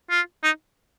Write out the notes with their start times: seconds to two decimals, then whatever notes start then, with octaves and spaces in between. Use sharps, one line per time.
0.10 F4
0.44 D#4